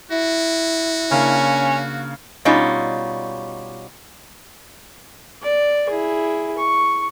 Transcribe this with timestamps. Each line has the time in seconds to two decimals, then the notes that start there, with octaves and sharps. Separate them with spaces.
0.11 E4 F#4
1.11 C#3 A#3 C#4 D4
2.45 B2 G3 C#4 D#4 F4
5.43 D5
5.89 E4 G#4
6.58 C#6